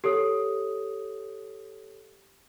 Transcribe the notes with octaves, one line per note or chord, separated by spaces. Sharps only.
G4 A4 C#5 D#6